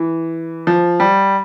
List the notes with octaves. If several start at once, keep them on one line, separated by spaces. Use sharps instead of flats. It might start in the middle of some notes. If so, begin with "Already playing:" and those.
Already playing: E3
F3
G3